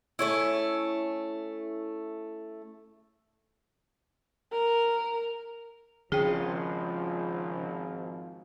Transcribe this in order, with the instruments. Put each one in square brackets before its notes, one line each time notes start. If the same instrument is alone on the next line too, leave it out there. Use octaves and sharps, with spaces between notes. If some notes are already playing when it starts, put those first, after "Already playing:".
[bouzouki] A3 C#4 E4
[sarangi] A#4
[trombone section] G#1 F3 [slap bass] C#3 [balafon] G#4 G5